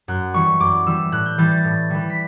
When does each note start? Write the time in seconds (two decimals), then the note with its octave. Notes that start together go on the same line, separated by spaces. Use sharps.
0.08 F#2 F#6
0.34 E3 G3 C#6
0.60 F#2 D6
0.86 E3 G3 E6
1.12 A2 F#6
1.26 G6
1.38 E3 G3 A6
1.51 A6
1.64 A2
1.90 E3 G3
2.10 B6